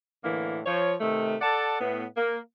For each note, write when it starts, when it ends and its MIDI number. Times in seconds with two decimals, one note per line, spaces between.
0.24 0.60 45
0.24 0.60 50
0.24 0.60 52
0.24 0.60 58
0.66 0.94 53
0.66 0.94 73
1.01 1.36 48
1.01 1.36 51
1.01 1.36 57
1.41 1.76 69
1.41 1.76 74
1.41 1.76 78
1.41 1.76 81
1.81 2.04 45
1.81 2.04 59
2.16 2.38 58